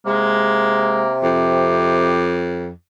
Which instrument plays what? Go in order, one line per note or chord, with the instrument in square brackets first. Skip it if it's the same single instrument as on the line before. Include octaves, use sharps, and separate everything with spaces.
[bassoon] C3 [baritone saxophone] G#3 [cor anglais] A#3
[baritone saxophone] F2 [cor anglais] G4